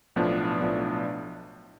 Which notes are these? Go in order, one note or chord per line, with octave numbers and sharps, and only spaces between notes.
B1 A2 F3 B3 D4
B1 A2 F3 B3 D4